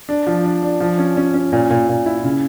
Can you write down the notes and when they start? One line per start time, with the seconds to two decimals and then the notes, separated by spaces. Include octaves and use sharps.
0.09 D4
0.27 F3
0.45 D4
0.63 D4
0.80 F3
0.98 C#4
1.17 C#4
1.34 C#4
1.52 A#2
1.70 A#2
1.89 A#2
2.06 E4
2.24 C#3